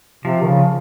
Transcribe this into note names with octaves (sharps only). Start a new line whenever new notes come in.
C3 F3
D#3
C#3